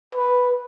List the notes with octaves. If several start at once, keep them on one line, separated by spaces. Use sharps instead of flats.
B4